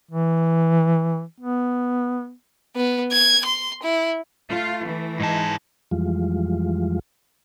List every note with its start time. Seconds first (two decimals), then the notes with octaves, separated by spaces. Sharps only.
0.11 E3
1.40 B3
2.76 B3
3.12 G#6
3.45 C6
3.82 E4
4.50 A3 F4
4.85 E3
5.20 G#2 G#3 D#4 A5
5.91 F2 E3 F3 G3 G#3 F4